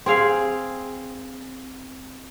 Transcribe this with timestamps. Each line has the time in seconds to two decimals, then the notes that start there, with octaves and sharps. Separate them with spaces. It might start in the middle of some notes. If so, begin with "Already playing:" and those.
0.06 C4 G#4 F5